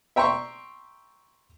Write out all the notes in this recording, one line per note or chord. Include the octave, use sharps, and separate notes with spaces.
E5 G5 A#5 C6 C#6